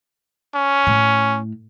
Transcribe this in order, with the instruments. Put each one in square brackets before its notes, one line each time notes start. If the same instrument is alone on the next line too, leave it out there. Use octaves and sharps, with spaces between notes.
[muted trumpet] C#4
[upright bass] A2